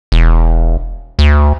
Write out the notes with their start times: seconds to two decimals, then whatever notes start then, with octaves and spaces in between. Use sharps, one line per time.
0.12 E1
1.19 D2